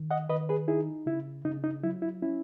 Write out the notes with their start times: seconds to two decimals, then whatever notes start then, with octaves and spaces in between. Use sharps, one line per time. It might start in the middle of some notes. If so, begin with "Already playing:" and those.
Already playing: D#3
0.11 D#5 F#5
0.29 D#3 B4 D#5
0.49 G#4 B4
0.68 D#4 E4 G#4
1.06 C#3 E4
1.45 C#3 D#4
1.64 D#4
1.83 F#3 E4
2.02 E4
2.22 C#4 E4